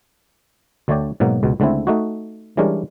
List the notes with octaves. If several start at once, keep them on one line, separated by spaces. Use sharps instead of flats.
D2 D3 A3 C#5 D5 G5
G#2 B2 F#3 A#3
C#2 B2
C#2 D3 A3 C4 E4
A3 D#4 F#4
E3 G3 G#3 C#4 D4 A#4